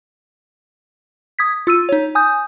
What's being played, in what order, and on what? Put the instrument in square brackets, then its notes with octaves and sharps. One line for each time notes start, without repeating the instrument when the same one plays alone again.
[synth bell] D#6 G#6 B6
F4 E6 D#7
D#4 C#5
G#5 D#6 G6